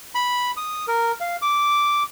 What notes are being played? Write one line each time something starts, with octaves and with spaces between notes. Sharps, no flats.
B5
D#6
A#4
F5
D6